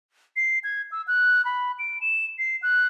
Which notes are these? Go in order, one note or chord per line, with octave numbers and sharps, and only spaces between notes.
C7
G#6
E6
F#6
B5
D7
E7
C7
F#6